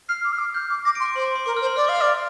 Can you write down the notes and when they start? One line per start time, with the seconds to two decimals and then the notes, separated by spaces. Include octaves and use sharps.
0.09 F6 C7
0.25 D6
0.32 F6
0.39 D6
0.54 F6 G6
0.70 D6
0.85 D6 A#6
0.95 C6 D7
1.05 D6
1.15 C5 C6
1.25 D6
1.36 C6
1.46 A#4 D6
1.57 F6
1.62 C5
1.66 C6
1.76 D5 F6
1.87 F5 D6
1.96 F6
2.01 D5
2.07 F6